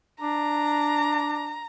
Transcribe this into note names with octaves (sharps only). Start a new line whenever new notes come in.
D4 A#5